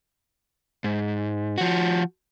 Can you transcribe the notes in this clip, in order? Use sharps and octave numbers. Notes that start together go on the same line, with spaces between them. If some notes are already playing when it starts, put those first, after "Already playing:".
G#2
F3 F#4